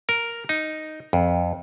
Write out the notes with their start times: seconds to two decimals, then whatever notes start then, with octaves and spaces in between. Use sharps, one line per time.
0.09 A#4
0.49 D#4
1.13 F2